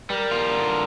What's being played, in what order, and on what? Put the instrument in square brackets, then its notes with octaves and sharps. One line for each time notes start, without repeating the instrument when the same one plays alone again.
[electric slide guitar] G3 [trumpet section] A#4
[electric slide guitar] F4
D3